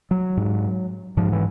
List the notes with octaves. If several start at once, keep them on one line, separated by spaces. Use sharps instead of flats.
F#3
G#2
G#2 F3
E3